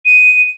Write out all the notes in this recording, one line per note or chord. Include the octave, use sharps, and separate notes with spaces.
D#7